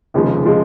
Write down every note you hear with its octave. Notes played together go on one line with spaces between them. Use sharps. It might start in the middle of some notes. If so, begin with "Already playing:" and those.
F1 D#2 C#3 F3 G#3
C#3 F3 G#3